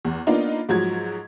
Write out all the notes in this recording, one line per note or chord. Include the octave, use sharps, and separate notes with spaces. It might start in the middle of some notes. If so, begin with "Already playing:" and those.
E2
A#3 B3 D4 D#4 F4
G#2 F3 F#3 F#4 G#6